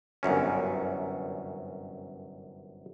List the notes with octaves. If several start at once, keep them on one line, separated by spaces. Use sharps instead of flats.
G1 C2 F#2 C#4